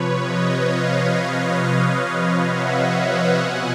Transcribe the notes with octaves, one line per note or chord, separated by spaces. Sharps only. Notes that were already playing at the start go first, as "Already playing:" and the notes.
Already playing: C3 F3 B4 C#5
C#5 D#5
D#5 F5
E5 F#5
B2 F#5 G#5